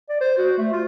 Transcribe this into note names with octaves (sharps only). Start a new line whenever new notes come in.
D5
C5
F#4
A3
F4